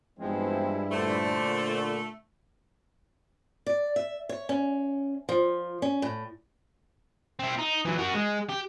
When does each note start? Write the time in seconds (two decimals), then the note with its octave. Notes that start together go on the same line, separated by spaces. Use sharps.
0.19 G2 E3 F3 G3 G#3 B3 C4 E4
0.91 A#2 D3 A3 C5 D5
3.66 D5
3.96 E5
4.29 C#5
4.49 C#4
5.29 F3
5.82 C#4
6.02 A2
7.40 C4 E4
7.58 D#4
7.85 E3 F#3
7.98 F#4 A#4
8.14 G#3
8.49 G4